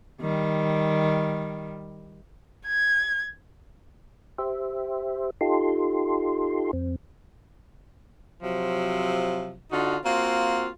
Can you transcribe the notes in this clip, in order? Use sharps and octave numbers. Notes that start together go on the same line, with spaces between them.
D#3 G3
G#6
G4 C5 E5
D#4 F4 G4 A4 C6
F2 C4
C3 F3 F#3
D3 D#4 F4 F#4
A#3 C4 F4 F#4